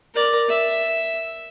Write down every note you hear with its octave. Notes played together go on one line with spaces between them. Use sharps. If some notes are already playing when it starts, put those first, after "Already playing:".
A#4 D5
E5